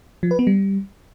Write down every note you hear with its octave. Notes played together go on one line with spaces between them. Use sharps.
F3
B4
B3
G3